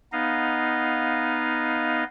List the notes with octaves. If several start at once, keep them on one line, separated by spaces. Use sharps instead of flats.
B3 D#4 D#5 F5